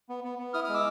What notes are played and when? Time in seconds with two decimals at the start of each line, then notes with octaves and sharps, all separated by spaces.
0.09 B3
0.24 B3
0.39 B3
0.54 E4 D#6 F6
0.64 G#3 D#6 F6
0.74 D6 E6